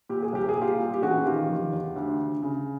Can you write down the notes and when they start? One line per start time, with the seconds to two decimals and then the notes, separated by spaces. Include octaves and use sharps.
0.09 A#2 G4
0.22 G#4
0.33 C2 G4
0.49 G#4
0.56 A#2
0.62 F4 G4
0.79 A#2
0.94 G4
1.03 A1 F#4 G#4
1.26 D#3 F4 G4
1.49 F1
1.73 E2
1.96 D2
2.19 D2
2.42 C#3